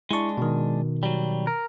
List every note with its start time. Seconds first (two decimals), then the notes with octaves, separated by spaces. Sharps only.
0.11 G#3 D4 E4 C#6
0.38 B2 D#3
1.03 F#3 G3
1.47 A#4